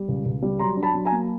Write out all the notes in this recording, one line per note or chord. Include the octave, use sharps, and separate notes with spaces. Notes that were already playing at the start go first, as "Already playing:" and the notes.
Already playing: G3
C#2
C#2
G3
F#3 A#5 C6
D4
A5 B5
F#3
G#5 A#5
A#3